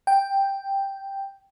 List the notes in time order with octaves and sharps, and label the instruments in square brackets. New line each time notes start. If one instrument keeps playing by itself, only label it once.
[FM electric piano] G5